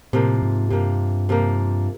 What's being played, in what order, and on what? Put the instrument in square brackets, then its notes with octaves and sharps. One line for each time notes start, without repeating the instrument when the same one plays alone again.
[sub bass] A2 [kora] C3 F3 A#3
[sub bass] G#2
[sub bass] G2 [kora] C3 F3 A#3
[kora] C3 F3 A#3